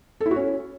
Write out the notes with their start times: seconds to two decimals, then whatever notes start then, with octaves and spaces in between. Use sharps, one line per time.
0.21 A4
0.26 E4
0.31 F#4
0.36 C#4